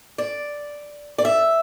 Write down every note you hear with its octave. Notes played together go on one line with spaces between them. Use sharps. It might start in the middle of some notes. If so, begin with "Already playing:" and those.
D5
D5
E5